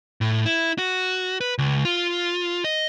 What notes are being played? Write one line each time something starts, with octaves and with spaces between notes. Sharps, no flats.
A2
E4
F#4
B4
C#2
F4
D#5